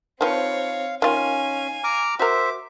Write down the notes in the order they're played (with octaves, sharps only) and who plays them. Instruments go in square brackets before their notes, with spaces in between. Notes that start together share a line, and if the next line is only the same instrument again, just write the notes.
[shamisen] D#3 F3 B4 [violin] C4 C#5 [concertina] F5
[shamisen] D#3 F4 [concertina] C#4 [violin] F5 G#5
[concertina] A#5 D6 F6
[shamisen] F#4 A#4 [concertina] C5 E5 [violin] D6